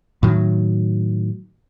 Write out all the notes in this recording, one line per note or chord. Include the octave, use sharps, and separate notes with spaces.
A2 D#3 F#3